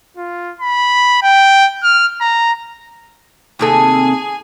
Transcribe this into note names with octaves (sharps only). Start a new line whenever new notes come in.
F4
B5
G5
F6
A#5
D#2 C3 G#4 A4 G#5